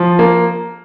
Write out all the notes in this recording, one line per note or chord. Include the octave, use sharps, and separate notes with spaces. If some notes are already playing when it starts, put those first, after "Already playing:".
Already playing: F3
A#3